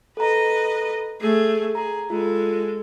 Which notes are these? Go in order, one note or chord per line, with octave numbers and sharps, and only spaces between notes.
A4 B4 D#5 A#5
A3 G#4 C7
G#4 A#5
G#3 F4 A4